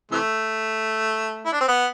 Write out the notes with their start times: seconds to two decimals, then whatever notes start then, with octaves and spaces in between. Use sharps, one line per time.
0.11 C3 E3 A3
1.46 E4
1.53 D4
1.61 C4
1.68 B3